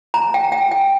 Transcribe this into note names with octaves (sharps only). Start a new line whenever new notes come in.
A#5
G5
G5
G5